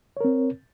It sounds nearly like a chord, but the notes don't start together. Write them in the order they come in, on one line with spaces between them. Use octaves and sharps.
C#5 A#4 C4